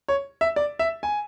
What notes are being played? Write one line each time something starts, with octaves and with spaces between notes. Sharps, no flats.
C#5
E5
D5
E5
G#5